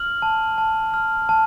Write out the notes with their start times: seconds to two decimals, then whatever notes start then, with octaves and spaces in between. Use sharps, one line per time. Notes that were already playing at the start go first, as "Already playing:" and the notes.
Already playing: F6 F#7
0.22 A5
0.58 A5
0.94 F6
1.29 A5